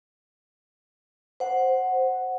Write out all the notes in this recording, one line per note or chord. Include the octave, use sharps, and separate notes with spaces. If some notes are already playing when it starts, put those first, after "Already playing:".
C5 F#5